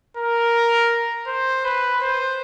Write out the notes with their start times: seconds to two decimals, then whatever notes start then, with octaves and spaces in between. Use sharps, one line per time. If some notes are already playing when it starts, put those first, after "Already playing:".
0.17 A#4
1.27 C5
1.65 B4
2.01 C5